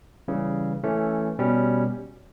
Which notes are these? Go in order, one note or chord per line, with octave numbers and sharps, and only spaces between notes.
C#3 E3 G3
E3 A3 C#4
B2 G3 C#4